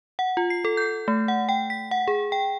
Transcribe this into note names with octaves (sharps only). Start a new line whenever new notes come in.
F#5
F4
C7
A4
G6
A3
F#5
G5
B6
F#5
G#4
G5